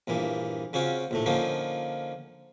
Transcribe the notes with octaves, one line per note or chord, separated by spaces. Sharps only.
A#1 G2 E3 A#3
C#3 C4 C#4 F4 F#4
A#1 A2 A3
D3 F3 A#3 C#4 D#4 F4